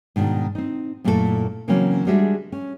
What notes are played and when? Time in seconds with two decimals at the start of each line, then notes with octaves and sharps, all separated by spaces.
0.16 G#2 B2 D#3 D4
0.55 C4 D#4
1.04 F#2 A#2 A3 E4 G4 A4
1.68 C#3 E3 F#3 A#3 C4 C#4
2.07 G3 G#3 D4 F#4 G#4 E5
2.52 C#4